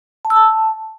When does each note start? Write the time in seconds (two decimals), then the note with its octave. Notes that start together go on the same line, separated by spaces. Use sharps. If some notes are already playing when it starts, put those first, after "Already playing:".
0.25 A5
0.30 E6
0.36 A5